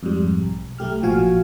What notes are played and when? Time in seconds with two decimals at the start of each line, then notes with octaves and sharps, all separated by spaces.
0.03 F2 G#2 G3
0.41 B1
0.79 B1 A3 G4 F6
1.02 A1 A#2 F3 F#4 F5 G#5